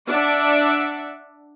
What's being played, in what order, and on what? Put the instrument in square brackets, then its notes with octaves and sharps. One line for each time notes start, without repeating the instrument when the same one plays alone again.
[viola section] D4 D5 E5 F#5